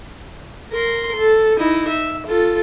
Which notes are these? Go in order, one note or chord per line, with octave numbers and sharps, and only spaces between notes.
A#4 C6
A4
D#4 E4
E5
F4 A4